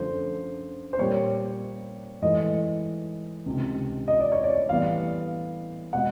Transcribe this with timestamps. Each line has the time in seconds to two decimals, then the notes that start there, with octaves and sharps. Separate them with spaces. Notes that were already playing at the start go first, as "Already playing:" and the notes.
Already playing: F#2 D3 F3 A3 C5
0.93 C5
0.99 A#2 G3 A#3 C#5
2.22 G#2 E3 A3 D#5
3.46 C#2 C3 D#3
4.08 D#5
4.20 D5
4.32 C#5
4.44 D5
4.69 A2 E3 G3 B3 F5
5.93 B2 G#3 F#5